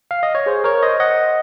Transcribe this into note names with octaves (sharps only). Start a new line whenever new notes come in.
F5
D#5
C#5
G#4 C5
A#4 C#5
C5 D#5
D#5 F#5